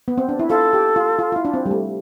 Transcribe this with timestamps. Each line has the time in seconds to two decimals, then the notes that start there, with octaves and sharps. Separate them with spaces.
0.08 B3
0.18 C4
0.29 D4
0.39 E4
0.50 F4 A4
0.73 G4
0.96 F4
1.19 F4
1.32 F4
1.36 E4
1.45 D4
1.54 C4
1.66 G3
1.71 A3